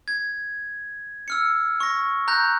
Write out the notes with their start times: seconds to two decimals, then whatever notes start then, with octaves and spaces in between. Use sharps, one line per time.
0.08 G#6
1.28 E6 F6 C#7
1.80 C#6 A#6
2.28 A#5 F#6 G6 A#6